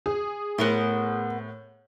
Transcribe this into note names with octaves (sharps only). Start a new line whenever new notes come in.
G#4
A2 B3 A#4 C5